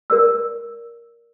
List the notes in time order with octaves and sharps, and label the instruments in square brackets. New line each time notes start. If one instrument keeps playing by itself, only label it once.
[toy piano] A#4 D5 E6